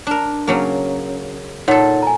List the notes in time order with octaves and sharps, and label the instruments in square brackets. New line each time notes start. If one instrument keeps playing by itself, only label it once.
[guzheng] D4 A#4
C#3 F#3 A#3
[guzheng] A#2 A4 [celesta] D#4 C#5 F#5
[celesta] G#5 A#5